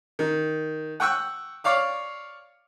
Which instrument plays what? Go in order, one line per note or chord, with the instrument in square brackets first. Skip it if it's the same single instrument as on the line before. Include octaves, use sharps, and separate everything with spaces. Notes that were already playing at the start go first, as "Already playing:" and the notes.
[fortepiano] D#3
F#5 G5 C#6 E6 F#6
C#5 D5 F5 D6